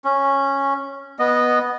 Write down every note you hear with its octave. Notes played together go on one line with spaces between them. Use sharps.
C#4
B3 D#5